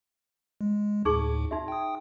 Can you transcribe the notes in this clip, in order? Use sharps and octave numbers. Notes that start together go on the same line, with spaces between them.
G#3
D2 A2 D#4 G#4 C#6
D#4 F#4 E5
G5 D#6